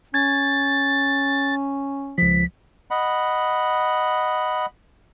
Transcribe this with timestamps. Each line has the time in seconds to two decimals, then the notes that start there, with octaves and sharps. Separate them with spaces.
0.14 C#4 G#6 A6
2.18 C#2 F3 B6
2.91 D#5 F#5 B5